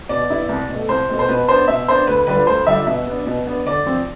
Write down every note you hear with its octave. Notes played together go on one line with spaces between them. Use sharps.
B2 D5
B3 E4
C2
B2 A3
C2 C5
B2 A3
C5
B2 B4
B3 D4 C5
B2 E5
B3 D4 C5
D2 B4
D3 G3 D4 F4 B4
D2 C5
D3 G3 D4 F4 E5
B2 E5
B3
D4
B2
B3 D4
D3 D5
F3 C4 F4